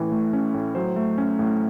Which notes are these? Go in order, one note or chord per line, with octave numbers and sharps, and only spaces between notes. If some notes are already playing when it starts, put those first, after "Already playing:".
Already playing: A2 E3 A3 C#4
A3
C#4
A2
F#3 C5
A3
C#4
A2